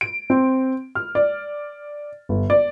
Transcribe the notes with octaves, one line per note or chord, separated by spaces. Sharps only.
D7
C4
F6
D5
G1
D5